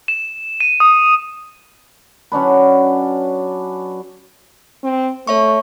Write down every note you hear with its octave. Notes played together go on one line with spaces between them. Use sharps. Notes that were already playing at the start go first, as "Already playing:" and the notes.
E7
D#7
D#6
F#3 C#4 D4 B4
C4
A3 C#5 E5 C#6